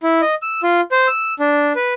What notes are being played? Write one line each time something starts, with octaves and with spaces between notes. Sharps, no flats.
E4
D#5
E6
F4
C5
E6
D4
B4